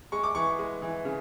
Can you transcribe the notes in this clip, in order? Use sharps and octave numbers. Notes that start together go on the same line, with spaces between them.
G#3 C#6
D6
E3 C#6
G#3
E3
C#3